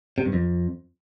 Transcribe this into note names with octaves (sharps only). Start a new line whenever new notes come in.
C3
G2
F2